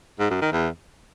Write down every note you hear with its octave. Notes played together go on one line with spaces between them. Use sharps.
G#2
F#2
D#3
E2